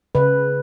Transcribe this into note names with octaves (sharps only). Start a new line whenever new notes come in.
C#3 B4